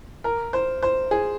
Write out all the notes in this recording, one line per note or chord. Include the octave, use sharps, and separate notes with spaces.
A#4
C5
C5
G#4